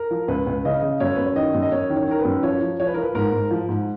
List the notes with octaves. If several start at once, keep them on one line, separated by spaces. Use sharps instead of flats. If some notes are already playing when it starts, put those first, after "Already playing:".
Already playing: A#4
F3
C#2 B4
C#2
C#3 D#5
C#3
F#2 C#5
F#2 B4
C#5
D#3 D#5
F#2
D#5
F#2 C#5
D#3
C#5
D#3 A#4
B4
F#2
F3 C#5
F3
F3 C#5
B4
A#4
F3 B4
G#2 A#4
G#2
F3
G#2